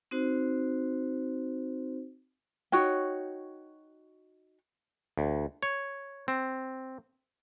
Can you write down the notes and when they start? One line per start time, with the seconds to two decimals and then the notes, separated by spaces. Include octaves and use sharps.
0.11 C4 D#4 F#4 C5
2.72 D#4 F#4 C#5 G5
5.18 D2
5.63 C#5
6.28 C4